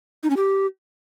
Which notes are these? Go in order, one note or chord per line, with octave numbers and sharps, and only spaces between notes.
D#4
C#4
G4